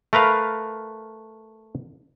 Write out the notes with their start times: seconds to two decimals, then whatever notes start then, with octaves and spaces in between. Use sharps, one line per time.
0.13 A3 A#4 B4 F5